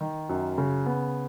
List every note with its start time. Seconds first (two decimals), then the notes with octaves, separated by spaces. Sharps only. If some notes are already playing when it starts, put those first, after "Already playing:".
0.01 D#3
0.29 F#2
0.58 C#3
0.86 B3